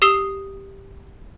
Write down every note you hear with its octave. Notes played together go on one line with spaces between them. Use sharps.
G4 D#6 E6 C7 E7 G7